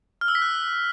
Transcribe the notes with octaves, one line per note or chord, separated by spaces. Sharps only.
F6
E6
B6
F#6